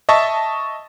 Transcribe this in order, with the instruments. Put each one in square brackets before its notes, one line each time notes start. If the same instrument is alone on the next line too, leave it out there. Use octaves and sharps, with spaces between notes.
[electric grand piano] D#5 E5 A5 C#6